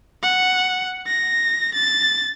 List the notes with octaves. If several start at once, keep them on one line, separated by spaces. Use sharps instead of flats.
F#5
A#6
A6